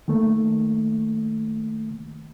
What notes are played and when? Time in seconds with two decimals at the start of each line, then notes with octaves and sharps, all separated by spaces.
0.08 D#3 A3 A#3